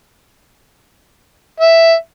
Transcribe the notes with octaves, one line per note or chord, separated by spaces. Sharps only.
E5